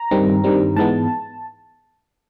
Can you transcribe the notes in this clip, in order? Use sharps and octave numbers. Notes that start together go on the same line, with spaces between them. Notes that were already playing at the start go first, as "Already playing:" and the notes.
Already playing: A#5
G2 D#3 G3 C4
G2 D#3 G3 C4
G#2 E3 G#3 B3 A5